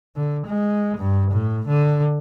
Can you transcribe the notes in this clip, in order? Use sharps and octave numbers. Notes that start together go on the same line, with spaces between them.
D3
G#3
G2
A2
D3